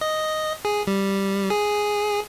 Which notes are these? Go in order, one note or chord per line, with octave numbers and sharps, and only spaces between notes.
D#5
G#4
G3
G#4